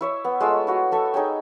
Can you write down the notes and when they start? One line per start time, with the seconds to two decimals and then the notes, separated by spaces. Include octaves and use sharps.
0.01 E4 C#5 E5
0.24 B3
0.40 G#3 A3 F4 E6
0.67 E4 F#4 F5
0.92 A3 A4 E5
1.14 D#4 G#4 C#5 G5